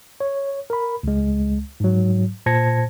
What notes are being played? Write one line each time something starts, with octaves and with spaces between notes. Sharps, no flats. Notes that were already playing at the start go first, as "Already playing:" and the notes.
C#5
A#4 B5
C#2 G#3
G#2 F#3
A#2 C5 A5 G#6 A#6 C#7